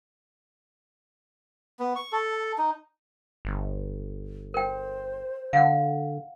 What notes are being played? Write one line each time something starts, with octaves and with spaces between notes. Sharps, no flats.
B3
C#6
A4
D#4
G1
A#4 C5 G5
D3 F5 F#5